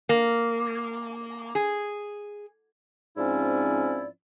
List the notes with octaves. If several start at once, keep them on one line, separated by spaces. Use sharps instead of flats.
A#3
G#4
G#2 F3 C4 C#4 E4 D5